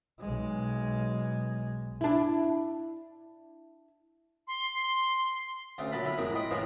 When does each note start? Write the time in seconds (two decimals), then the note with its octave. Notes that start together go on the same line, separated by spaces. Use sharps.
0.20 B1 G#3
2.01 D4 E4
4.48 C6
5.78 D2 C#3 A3
5.92 A#1 F#3 A5 B5
6.05 B1 E5 G#5 B5
6.18 F2 A2 G#3 A#3
6.35 D#5 G5 B5 C6 D#6
6.51 A2 C#3 E3 F3 G#3 A#3